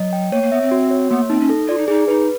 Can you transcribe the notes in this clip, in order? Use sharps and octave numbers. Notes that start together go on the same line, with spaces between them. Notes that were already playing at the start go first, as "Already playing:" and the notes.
Already playing: F#3 D#5
G5
A#3 C#5
A#3
B3 E5
C4
F#4
C#5
A#3 B3
C4 D#4
C#4
A4
F4 D5
D#4
D#4 G#4
D#4 B4